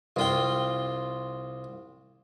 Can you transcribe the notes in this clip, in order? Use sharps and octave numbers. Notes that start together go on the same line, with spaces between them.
C2 F4 G5